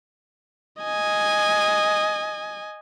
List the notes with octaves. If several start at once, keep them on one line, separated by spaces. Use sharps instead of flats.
D#5 G#5